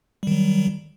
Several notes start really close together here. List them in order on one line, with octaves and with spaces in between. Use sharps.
G3 D#3 F#3